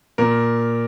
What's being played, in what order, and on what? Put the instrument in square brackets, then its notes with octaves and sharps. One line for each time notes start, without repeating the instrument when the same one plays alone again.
[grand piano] A#2 A#4